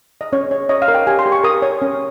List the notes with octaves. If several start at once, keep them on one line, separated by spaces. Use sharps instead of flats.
D#5
C#4 C#5
C#5
C#5 D#5
F5
A#4
G5
G4 G#5
C6
G4
C#6
A#4 D#6
C#5
C#4